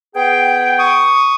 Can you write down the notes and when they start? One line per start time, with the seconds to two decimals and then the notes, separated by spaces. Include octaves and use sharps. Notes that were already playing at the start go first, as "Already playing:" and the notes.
0.16 B3 G#4 G5
0.79 C#6 D#6